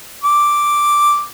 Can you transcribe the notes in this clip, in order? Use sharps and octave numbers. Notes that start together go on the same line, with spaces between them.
D6